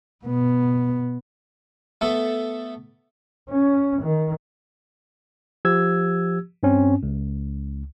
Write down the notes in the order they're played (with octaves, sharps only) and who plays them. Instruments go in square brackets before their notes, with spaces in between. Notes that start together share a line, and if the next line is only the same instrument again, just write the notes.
[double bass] B2 B3
[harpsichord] A3 B3 A4
[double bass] C#4
D#3
[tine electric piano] F3 G4 E6 G#6
G2 C4 C#4
C#2